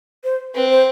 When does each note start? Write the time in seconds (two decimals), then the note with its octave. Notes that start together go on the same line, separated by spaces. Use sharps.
0.24 C5
0.55 C4 B4
0.70 C5